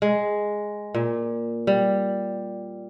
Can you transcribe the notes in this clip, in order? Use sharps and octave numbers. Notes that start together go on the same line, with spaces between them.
G#3
A#2
G3